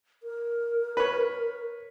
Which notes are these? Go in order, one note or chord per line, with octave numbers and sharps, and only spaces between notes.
A#4
B4 C#5